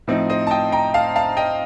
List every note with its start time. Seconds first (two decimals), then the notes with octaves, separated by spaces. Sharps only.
0.07 A2 F3 C4 D#4
0.30 C5 D#5
0.47 A5
0.51 D#5 G5
0.72 G5 A#5
0.94 F5 A5
1.16 F5 A5
1.37 D#5 G5